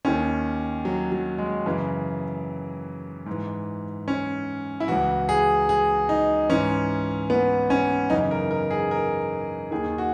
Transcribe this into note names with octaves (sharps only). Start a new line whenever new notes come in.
D#2 D#3 C#4
F#3
F#3
G#3
F#2 C#3 E3
G#2 E3
C#4
E4
C#2 C#3 E3 F#4
G#4
G#4
D#4
G#2 E3 C#4
B3
C#4
F#2 C#3 E3 D#4
A#4
A#4
G#4
A#4
D#2 D#3 G#4
F#4